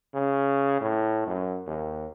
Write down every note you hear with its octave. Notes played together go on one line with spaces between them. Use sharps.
C#3
A2
F#2
D#2